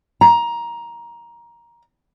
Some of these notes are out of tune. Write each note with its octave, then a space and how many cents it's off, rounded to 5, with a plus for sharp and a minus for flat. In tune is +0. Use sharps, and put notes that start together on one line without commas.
A#5 +15